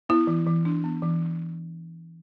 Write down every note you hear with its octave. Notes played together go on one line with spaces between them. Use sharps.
B3 E4
E3
E3
D4
B3
E3